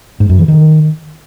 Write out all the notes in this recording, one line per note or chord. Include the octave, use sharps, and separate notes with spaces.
G#2
F#2
E3
D#3